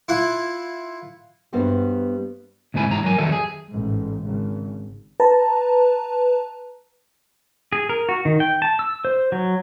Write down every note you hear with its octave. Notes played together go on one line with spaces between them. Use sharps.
E4 F4 F#5
G2 G3 B3 F#4 C5 E5
D2 G#2 C3 E4 G#5 B5
G#2 E3 A#5
F#3 A#4 G#5
F2 D#3 F#3 G3 A4 E5
G#4
A1 G#2
G#1 C#3
B4 A5 A#5
G#4
A#4
F#4
D#3
G5
A5
E6
C5
F#3